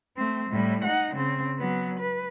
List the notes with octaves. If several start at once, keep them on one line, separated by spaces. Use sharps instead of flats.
A3 C4
A2 G3
D#4 F#5
C#3 C4
F#3 B3
B4